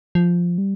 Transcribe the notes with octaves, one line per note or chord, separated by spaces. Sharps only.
F3
G3